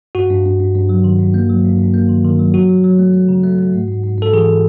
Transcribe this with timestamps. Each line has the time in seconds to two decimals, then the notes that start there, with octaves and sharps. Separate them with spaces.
0.15 G2 F#4
0.30 G2
0.45 G2
0.60 G2
0.75 G2
0.89 F#3
1.04 D#3
1.19 G2
1.34 A#3
1.50 F#3
1.64 G2
1.79 G2
1.94 A#3
2.09 D#3
2.24 D#3
2.39 F#3
2.54 F#3 F#4
2.69 F#3
2.84 F#3
2.99 A3
3.14 A3
3.29 C#3
3.44 A3
3.58 A3
3.73 G#2
3.88 G#2
4.03 G#2
4.18 G#2 A4
4.33 E3 G#4